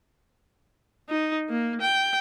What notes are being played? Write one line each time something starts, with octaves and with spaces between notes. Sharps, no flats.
D#4
A#3
G5